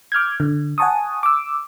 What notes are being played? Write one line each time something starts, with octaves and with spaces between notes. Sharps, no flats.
D6 F6 G6 G#6
D3
F#5 G#5 A5 C#6 D#6
D6 E6